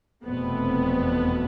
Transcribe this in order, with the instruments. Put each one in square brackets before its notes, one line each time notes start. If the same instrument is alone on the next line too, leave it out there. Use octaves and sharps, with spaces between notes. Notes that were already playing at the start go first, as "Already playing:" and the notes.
[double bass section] F1 E2 B2 A3 C4 [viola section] B3